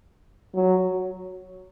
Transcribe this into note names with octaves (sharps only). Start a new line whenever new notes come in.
F#3